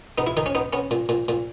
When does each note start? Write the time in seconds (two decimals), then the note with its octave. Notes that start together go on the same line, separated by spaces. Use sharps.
0.18 B3 D#4
0.27 E4
0.37 D#3 D#4
0.46 C#4
0.55 B3 D#4
0.73 B3 C#4
0.91 A#2
1.09 A#2
1.28 A#2